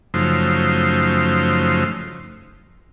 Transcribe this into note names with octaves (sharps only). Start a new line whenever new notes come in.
F#2 C#3 F3 A3 D#4 C5